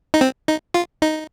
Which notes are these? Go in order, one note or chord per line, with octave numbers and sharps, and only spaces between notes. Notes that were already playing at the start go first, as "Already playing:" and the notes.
D#4
C4
D#4
F4
D#4